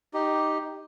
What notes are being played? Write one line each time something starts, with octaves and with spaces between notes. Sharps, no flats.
D#4 G4